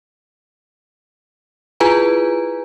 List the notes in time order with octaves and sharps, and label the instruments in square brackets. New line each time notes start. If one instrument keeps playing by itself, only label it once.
[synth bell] E4 F4 G#4 B4 G#5 A#5